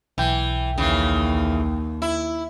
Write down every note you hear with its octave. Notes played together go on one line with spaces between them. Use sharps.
B1 E3 G5
D#2 C#3 E3
E4